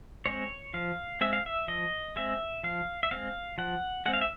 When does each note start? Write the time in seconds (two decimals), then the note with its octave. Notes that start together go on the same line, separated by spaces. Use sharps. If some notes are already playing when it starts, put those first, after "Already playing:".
0.26 G#3 C4 C#5
0.74 F3 F5
1.21 G#3 C4 E5
1.33 F5
1.46 E5
1.68 F3 D#5
2.16 G#3 C4 E5
2.63 F3 F5
3.03 E5
3.11 G#3 C4 F5
3.58 F3 F#5
4.06 G#3 C4 F#5
4.14 F5
4.21 E5